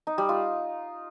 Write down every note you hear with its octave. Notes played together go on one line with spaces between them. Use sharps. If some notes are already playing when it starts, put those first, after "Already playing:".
D#4
G3
F4